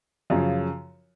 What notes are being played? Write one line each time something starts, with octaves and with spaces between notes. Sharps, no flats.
F#2 C#3 F3